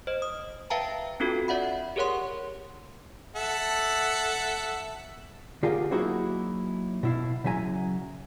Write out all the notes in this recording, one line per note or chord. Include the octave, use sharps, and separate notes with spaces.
C5 D#5
D#6
B4 E5 F5 G5 A5 A#5
C4 D4 F4 F#4 A4
D5 E5 F#5 B5
G4 G#4 A#4 C#5 F#5 C6
A4 E5 F#5
D3 F4 G4 G#4 A#4 F5
F#3 A#3 D#4 E4 F#4 G#4
B2 E4 F5
C#3 F#3 E5 G#5 A#5